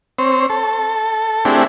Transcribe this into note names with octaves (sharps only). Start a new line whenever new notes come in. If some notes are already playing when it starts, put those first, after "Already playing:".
C4 C5 C#5
A4
A3 C4 D4 E4 G4 G#4